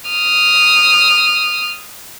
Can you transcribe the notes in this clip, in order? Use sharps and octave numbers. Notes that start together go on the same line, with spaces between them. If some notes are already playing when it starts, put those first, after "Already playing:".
D#6 F6